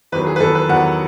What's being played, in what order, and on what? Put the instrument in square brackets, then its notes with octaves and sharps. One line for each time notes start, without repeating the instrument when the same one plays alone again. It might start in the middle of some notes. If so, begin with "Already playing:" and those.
[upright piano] E2 D#3 F#3 B4
G#4
B4
E2 D#3 F#3 A4
B4
E2 D#3 F#3 F#5